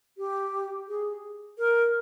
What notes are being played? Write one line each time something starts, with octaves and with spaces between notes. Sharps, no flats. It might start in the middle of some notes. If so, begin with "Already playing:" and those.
G4
G#4
A#4